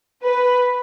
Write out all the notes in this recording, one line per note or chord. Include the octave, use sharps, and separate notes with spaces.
B4